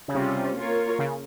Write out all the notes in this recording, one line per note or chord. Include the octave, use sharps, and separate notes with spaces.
C#3
C3 G3 C#4 F4
A#3 F4 A#4 C#5
C#3